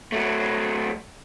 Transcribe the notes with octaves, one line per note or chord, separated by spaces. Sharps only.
F#3 A3